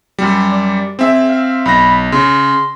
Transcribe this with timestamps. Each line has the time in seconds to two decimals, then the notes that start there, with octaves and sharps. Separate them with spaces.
0.19 F#2 G3
0.51 D5
0.99 C4 G#4 E5
1.29 F5
1.65 B1 B5 A#6
2.12 C#3 C6